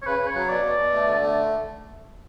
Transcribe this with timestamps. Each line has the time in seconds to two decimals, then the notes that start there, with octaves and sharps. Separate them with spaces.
0.02 C#5
0.06 C#3 B4
0.21 C#3
0.27 C#5
0.35 F#3
0.49 B2 D5
0.64 B2
0.78 B2
0.93 A3
1.07 D3
1.21 A3